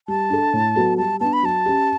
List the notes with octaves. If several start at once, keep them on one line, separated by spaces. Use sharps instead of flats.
G3 A5
D4 A4
A2
F#3 B3 F#4 A4
G3 A5
B3 D4 A5
B5
F#3 A5
C#4 G4